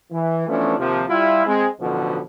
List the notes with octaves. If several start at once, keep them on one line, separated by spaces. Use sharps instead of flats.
E3
E3 F3 A3 B3 C#4 D4
D#2 C3 F3
G3 E4 F4
G#3 C4
A1 B2 D3 F3